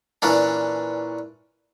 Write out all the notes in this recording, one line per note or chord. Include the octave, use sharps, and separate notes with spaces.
A#2 E3 C#4 D4